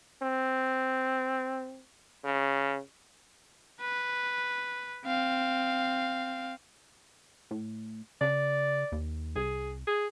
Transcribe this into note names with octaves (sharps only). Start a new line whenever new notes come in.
C4
C#3
B4
C4 F5
A2
C#3 D5
D#2
C2 G#4
G#4